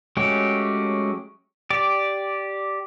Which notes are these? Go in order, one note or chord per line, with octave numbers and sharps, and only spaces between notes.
F#3 G#3 A3 C#4 G4
G4 D5